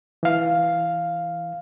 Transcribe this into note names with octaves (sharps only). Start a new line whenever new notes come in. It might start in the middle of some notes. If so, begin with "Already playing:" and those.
E3 F5